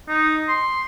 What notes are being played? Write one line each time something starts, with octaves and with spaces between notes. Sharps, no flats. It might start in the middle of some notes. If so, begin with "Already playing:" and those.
D#4
C6